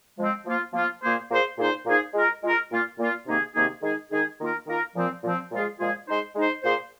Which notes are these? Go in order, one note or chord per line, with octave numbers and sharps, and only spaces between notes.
F3 G#3 C4
F3 A#3 F4
F3 A#3 F4
A#2 A#3 G#4 C5
A#2 A#3 G#4 C5
A#2 A#3 D#4 G#4 C5
A#2 A#3 D#4 G#4 C5
G#3 F4 A#4
G#3 F4 A#4
A#2 A#3 F4
A#2 A#3 F4
C3 D#3 A#3 D#4 G#4
C3 D#3 A#3 D#4 G#4
D#3 G#3 D#4 G#4
D#3 G#3 D#4 G#4
D#3 A#3 F4 A#4
D#3 A#3 F4 A#4
A#2 F3 C4
A#2 F3 C4
A#2 F3 G#3 F4 G#4
A#2 F3 G#3 F4 G#4
G#3 D#4 C5
G#3 D#4 C5
A#2 A#3 G#4 C5